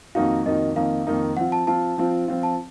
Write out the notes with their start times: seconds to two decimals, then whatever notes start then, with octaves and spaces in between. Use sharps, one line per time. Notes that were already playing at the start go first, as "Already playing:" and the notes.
0.15 F2 D#3 A#3 D#4 F#4 F5
0.46 F2 D#3 A#3 D#4 F#4 D#5
0.76 F2 D#3 A#3 D#4 F5
1.07 F2 D#3 A#3 D#4
1.37 F3 C4 F4 F#5
1.52 A5
1.67 F3 C4 F4 A5
1.98 F3 C4 F4
2.28 F3 C4 F4
2.43 A5